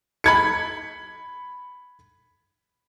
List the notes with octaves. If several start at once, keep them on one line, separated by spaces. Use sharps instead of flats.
B5 G#6 C#7